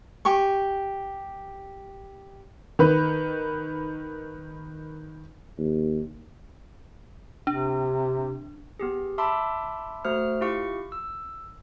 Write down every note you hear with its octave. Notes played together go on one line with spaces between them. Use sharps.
G4 G#5 C#6
D#3 B4
D#2
C3 D4
B3 G4 G#4
E5 A5 B5 C6 D6 E6
A3 F#4 C5 F6
E4 F4 G4 F5 C#6 C#7
E6